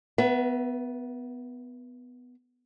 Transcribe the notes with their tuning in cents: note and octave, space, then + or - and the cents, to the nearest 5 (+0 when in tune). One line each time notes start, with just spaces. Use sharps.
B3 +15 B4 -35 E5 +35